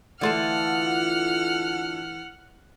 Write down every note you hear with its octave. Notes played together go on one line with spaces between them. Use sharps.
D3 E3 A3 F4 F#5 A5 F6